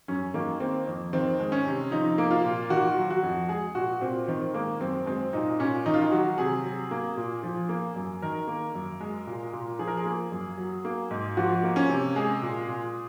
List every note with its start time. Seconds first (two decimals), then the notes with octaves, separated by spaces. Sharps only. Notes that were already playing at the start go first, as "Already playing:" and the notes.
0.08 F#2 C#4
0.34 D#3 A#3
0.60 A#3 C4
0.87 F2
1.13 D#3 C4
1.39 G#3
1.52 C#4
1.65 C3
1.91 F3 D#4
2.18 A#3
2.31 F4
2.45 A#2
2.70 D#3 F#4
2.97 F#3
3.10 F#4
3.23 F2
3.49 G#3 G#4
3.75 A#2 F#4
4.01 A#2 C4
4.28 D#3 C4
4.54 G#3 A#3
4.81 F#2 C4
5.06 G#3 C4
5.33 A#2 D#4
5.59 A#2 C#4
5.86 D#3 D#4
5.94 F4
6.02 D#4
6.12 F#3 F#4
6.38 C3 G#4
6.64 F#3
6.91 A#3
7.17 A#2
7.43 F3
7.69 A#3
7.96 F#2
8.22 D#3 A#4
8.48 A#3
8.75 F#2
9.00 G#3
9.27 A#2
9.53 A#2
9.79 F3 G#4
9.88 A#4
9.97 G#4
10.06 A#3
10.32 F#2
10.58 F#3
10.85 A#3
11.11 G#2
11.37 F3 F#4
11.63 A#3
11.76 C#4
11.89 C3
12.16 G#3 G#4
12.42 A#2
12.68 A#2